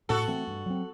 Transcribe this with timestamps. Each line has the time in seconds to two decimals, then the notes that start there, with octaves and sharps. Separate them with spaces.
0.09 A2 F#4 A4
0.28 E3 A3 C4
0.47 G2
0.66 F#3 C4